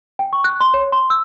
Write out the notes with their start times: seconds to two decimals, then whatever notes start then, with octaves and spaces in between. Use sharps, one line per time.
0.19 G5
0.33 C#6
0.44 F#6
0.61 C6
0.74 C#5
0.92 C6
1.10 E6